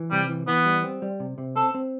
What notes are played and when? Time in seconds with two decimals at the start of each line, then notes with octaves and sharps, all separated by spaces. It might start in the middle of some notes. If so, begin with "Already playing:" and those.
Already playing: E3
0.11 C3 G3
0.29 E3
0.47 E3 B3
0.65 G3
0.84 C4
1.02 G3
1.20 C3
1.38 C3
1.56 C4 A4
1.75 C4